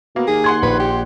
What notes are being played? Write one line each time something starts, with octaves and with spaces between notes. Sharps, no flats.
B2 A#3
D#2 G#4
F#5 C6 G#6
A#1 B4
G4